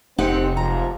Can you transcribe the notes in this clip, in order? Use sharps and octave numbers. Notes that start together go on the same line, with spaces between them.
F1 C4 D#4 G4 F#5
G#2 C3 F3 A#5